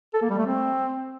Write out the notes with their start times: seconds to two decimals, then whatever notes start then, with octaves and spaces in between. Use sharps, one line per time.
0.14 A4
0.22 A#3
0.30 G3
0.38 A3
0.46 C4